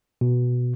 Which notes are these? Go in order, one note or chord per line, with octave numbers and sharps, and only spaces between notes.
B2